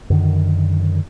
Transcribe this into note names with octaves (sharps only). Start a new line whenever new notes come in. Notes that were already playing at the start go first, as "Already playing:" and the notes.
F#2 D3 D#3